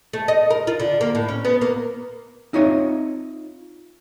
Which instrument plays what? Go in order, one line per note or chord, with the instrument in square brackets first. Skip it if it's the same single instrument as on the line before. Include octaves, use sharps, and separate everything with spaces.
[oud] A3
D#5
A#4
F4
D3
A#3
A2
C#4
B3
A#3
[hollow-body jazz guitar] C4 D#4 F4 C#5 D#5 E5